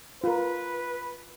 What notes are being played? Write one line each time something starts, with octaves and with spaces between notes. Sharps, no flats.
F4 A#4 B4